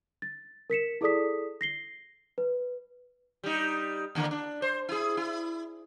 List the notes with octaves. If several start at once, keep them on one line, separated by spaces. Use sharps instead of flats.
A6
A#4 B6 C#7 E7
E4 G#4 A4 D5 D#6 B6
A#6 C7 G7
B4
G3 D#4
D#2 D3 A#3
D4
C5
E4 G#4
E4